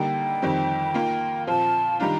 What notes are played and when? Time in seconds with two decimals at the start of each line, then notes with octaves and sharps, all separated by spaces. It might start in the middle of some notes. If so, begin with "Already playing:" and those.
Already playing: D3 G3 A#3 D#4 G5
0.42 F2 D#3 G3 C4
0.94 D#3 A#3 F4
1.47 A#2 F3 C4 F4 A5
1.99 D#3 G3 D4 F4 A#5